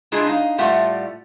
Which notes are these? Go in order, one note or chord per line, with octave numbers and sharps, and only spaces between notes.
G#3 D4 E4 F4 G#4
D#4 F5
A2 G3 A3 F4 E5 F#5